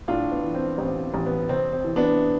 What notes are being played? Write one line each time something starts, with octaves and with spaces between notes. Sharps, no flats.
A2 D4 F4
B3
E3
C4
A1 C4
A1
B3
C3 C4
C4
E3
B3 D4